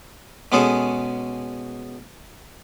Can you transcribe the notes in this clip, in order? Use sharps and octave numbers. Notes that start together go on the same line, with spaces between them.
B2 G#3 B3 C#4 G#4 A4